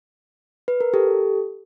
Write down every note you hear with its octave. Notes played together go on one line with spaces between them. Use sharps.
B4
A#4
G4 A4